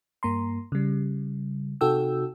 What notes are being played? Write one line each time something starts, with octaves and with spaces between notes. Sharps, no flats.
G2 A#3 A#5 C6
C#3 G3
C3 D#4 F#4 A4 G5 E6